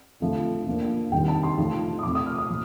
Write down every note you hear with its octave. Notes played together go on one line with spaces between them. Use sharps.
D3 F3 A3 C4
F3 A#3 D4
C3 D#3 G3 C4 G5
A5
C6
F3 A3 D#4
D#6
C3 F3 A3 C4 D6
D#6
F6
D#6
A#2 F3